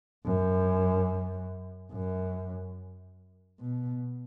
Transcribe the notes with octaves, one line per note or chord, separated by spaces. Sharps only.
F#2
F#2
B2